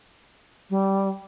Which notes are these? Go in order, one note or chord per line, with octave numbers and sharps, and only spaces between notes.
G3